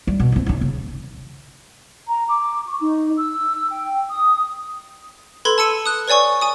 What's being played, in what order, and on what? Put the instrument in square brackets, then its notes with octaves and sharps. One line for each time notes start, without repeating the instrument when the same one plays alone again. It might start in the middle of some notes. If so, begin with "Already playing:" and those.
[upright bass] G3
B2
D2 C4
C#2 D#4
C#3
[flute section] A#5
D6
C#6
D#4
E6
G5
D#6
[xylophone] A4 B4 B5 C6 G#6
A5 E6 C#7 D#7
D#6 F#6
B4 C#5 D5 G#5 C#6
G#5 D#6